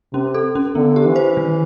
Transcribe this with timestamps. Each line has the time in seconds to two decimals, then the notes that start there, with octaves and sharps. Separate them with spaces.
0.13 C3 C#4
0.34 A4
0.55 C#4
0.75 D3 B3
0.96 G4
1.06 E3
1.16 C5
1.37 D#3